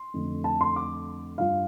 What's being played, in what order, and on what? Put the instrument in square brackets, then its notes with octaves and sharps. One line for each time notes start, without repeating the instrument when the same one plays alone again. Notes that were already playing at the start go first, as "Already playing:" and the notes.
Already playing: [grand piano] C6
F2 D3 A3
A5
C6
D6
G2 G3 F4 F5